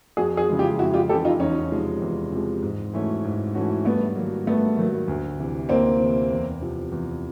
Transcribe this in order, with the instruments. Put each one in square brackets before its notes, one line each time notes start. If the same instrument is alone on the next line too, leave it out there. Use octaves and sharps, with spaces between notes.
[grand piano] F2 [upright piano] F#4 G#4
[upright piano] F#4 G#4
[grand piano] C#3 E3 G#3
[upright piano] F4 G4
[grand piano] F2 [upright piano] E4 F#4
[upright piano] F4 G4
[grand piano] C#3 E3 G#3 [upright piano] G4 A4
[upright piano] D#4 F4
[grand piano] E2 [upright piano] C#4 D#4
[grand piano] C3 F3 G#3
E2
C3 F3 G#3
G#2
E3 A3 C#4 F#4
G#2
E3 A3 C#4 F#4
[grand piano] G2 [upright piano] A3 B3
[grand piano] D#3 F#3 A#3
[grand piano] G2 [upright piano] A3 B3
[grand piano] D#3 F#3 A#3
D2
C3 E3
[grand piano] D2 [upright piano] A#3 C4
[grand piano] C3 E3
E2
C3 F3
E2